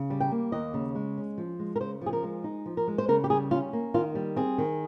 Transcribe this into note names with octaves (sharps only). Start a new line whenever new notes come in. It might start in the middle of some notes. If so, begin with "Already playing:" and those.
Already playing: C#3
G3
G5
A#3
D#2 D#5
C#3
G#3
C#4
F3
G#3
A#4
C#3 C5
F3
G#4
A#4
G#3
D#4
F3
A#4
G#3
C5
C#3 A#4
G4
G3 G#4
C#4 F4
A#3
D#3 F4
G3
C4 G#4
D#3